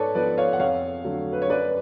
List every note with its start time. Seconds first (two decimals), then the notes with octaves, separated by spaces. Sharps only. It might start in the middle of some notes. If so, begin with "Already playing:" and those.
Already playing: G#2 A4 B4 C#5 D5
0.15 F3 B3 B4 D5
0.38 C#5 F5
0.53 F#5
0.60 F2 C#5 F5
1.04 D3 F#3 A3
1.33 B4
1.42 C#5
1.49 F#2 B4 D5